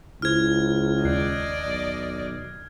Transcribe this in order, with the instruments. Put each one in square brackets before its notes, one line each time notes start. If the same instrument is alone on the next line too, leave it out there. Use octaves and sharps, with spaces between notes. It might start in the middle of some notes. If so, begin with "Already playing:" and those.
[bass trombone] C#2 [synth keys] E4 G#4 C5 [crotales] F6 G#6
[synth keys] D#2 F#6 C7 [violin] D5 D#5
[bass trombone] B1